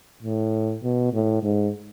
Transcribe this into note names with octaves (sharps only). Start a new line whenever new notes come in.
A2
B2
A2
G#2